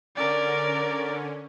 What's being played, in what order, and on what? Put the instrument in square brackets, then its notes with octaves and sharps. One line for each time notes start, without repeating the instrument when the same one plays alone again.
[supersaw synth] D3 C#4 [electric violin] A#4 D5